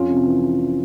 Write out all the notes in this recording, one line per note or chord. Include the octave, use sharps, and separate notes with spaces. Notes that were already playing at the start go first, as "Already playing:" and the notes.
Already playing: F2 C#4 F4
C3
E3